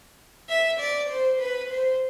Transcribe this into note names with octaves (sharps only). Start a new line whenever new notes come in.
E5
D5
C5
B4
C5